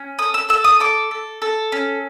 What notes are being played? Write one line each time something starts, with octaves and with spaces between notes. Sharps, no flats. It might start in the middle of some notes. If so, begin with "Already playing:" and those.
Already playing: C#4
A4 D#6
E6
A4 E6
D#6
A4 D6
A4
A4
C#4